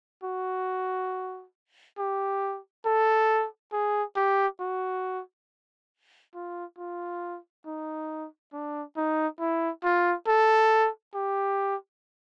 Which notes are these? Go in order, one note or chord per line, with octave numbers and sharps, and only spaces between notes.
F#4
G4
A4
G#4
G4
F#4
F4
F4
D#4
D4
D#4
E4
F4
A4
G4